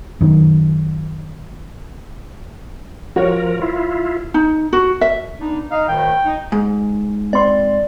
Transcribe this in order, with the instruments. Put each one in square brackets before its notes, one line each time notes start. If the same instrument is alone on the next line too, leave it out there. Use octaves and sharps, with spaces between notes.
[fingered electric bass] F#2 D#3
[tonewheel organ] F3 A#4 [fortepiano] F#4 C#5
[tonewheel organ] E4 F4
[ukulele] D#4
F#4
E5
[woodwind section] B3 D4 D#4
[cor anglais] D#4 [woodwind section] D#5 F5
[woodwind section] D2 A2 D#3 [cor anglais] G5
[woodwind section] D#4
[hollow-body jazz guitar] G#2
[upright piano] C4 C6 [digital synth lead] D5